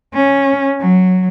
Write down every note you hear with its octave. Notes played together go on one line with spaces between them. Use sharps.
C#4
F#3